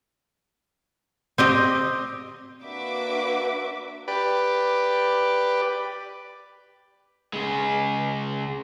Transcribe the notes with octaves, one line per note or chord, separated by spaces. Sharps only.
C4 G4 D#5
A#3 D4 F#4 B4 E5 D6
G4 B4 D5
C#3 G#3